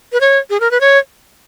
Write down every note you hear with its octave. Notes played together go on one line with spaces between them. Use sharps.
B4
C#5
G#4
A#4
B4
C#5